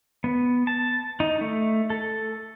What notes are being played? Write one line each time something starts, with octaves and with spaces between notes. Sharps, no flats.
B3
A5
D#4
A3
A4